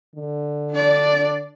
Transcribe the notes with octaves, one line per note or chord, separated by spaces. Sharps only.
D3
D4 D5